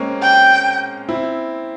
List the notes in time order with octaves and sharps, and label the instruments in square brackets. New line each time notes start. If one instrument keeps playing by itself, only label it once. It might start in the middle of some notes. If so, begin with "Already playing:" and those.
Already playing: [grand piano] G#3 A#3 C4 C#4
[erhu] G5
[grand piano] C4 E4